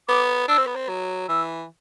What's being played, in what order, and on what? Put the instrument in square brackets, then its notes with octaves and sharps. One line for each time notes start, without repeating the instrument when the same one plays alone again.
[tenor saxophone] B3 [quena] D6
[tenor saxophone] D4 [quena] E6
[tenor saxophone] C4
B3
C4
F#3
[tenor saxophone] E3 [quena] E6